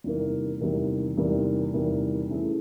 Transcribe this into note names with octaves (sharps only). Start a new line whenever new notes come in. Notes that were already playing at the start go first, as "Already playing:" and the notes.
E2 C3 D#3 G3 A#3
E2 C3 D#3 G3 A#3
E2 C3 D#3 G3 A#3
E2 C3 D#3 G3 A#3
E3 A3 C#4 E4 G#4